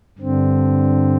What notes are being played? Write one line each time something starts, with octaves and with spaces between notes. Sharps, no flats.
G2 D3 C4